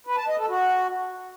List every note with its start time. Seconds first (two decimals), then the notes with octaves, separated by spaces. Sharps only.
0.07 B4
0.17 A5
0.28 D#5
0.39 A4
0.49 F#4